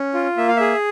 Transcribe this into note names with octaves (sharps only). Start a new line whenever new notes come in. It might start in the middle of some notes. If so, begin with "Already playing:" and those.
Already playing: C#4
F4
A#3 E5
F5
G#4 E5